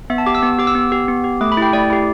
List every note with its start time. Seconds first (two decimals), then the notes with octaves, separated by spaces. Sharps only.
0.10 B3 E5
0.18 A5
0.26 G4 D6
0.35 E6
0.43 B3
0.58 G4 D6
0.67 E6
0.75 B3
0.92 G4
1.08 B3
1.24 G4
1.41 A3 D6
1.52 B5
1.57 E4 G4 G5
1.73 A3 D5
1.90 E4 G4